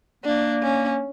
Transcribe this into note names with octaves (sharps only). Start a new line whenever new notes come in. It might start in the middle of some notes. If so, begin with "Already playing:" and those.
A#3 D4
C#4